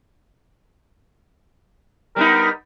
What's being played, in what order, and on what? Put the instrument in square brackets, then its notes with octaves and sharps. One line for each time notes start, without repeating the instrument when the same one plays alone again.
[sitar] G3 B3 D#4 [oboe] A#4